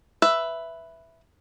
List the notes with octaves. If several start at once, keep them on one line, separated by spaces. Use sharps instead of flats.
B4 E5